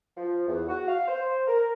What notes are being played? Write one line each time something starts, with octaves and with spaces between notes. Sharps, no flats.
F3
E2
F#4
F5
C5
A#4